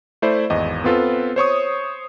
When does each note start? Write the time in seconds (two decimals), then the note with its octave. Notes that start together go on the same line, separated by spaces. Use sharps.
0.22 A3 E4 C5 D5
0.50 G#1 E2 D#5
0.84 B3 C4 F4 A4 B4
1.36 C5 C#5 C#6 D#6